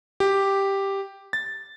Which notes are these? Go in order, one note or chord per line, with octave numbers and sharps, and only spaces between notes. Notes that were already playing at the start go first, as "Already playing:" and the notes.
G4
A6